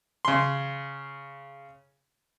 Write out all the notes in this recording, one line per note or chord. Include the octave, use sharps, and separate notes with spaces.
C#3 C6